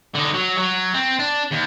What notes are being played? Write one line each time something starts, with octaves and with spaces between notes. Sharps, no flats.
D3 D#4
F#3
F#3
C4
D4
D#2